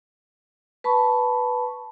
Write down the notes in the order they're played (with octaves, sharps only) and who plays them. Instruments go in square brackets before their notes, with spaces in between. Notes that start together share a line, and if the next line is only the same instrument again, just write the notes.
[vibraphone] B4 A5 B5 C#6